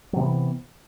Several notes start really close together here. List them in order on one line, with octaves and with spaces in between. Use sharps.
F#3 C3 E3 B3